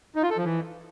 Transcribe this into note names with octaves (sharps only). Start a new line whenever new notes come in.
D#4
F4
A4
F3
E3